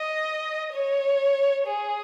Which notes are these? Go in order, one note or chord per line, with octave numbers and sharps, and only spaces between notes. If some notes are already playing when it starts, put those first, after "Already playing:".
Already playing: D#5
C#5
G#4